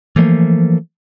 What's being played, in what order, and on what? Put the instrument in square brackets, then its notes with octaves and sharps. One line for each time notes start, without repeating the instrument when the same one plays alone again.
[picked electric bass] E3 F3 A3 A#3